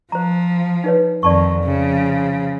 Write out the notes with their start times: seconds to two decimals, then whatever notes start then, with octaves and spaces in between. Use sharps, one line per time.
0.12 F3 C5 A#5
0.84 D#4 B4 C#5
1.23 F2 D#3 D5 A5 C#6
1.64 C#3 F3